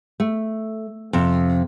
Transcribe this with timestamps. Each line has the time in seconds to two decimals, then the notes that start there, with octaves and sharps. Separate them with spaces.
0.20 A3
1.13 F2 C3